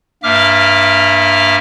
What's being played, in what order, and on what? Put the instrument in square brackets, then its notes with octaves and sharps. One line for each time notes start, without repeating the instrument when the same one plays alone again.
[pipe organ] G2 A#3 E5 D6 F6